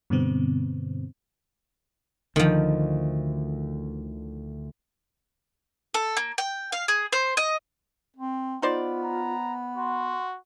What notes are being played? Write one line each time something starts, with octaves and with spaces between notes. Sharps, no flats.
G2 B2 D3 G3 B3 C4
D2 D3 D#3 F3
A4
A#3
G5
F5
G#4
C5
D#5
C4
B3 D#4 F4 C5 D5
A#5
F#4 C6